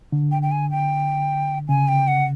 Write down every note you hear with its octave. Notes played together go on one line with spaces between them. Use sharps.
D3
G5
G5
G#5
G5
C#3 G#5
G5
F#5